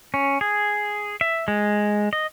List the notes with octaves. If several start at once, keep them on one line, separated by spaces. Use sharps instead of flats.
C#4
G#4
E5
G#3
D#5